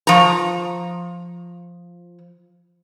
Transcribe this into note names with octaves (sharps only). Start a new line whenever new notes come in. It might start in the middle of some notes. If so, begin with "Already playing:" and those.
F3 A#5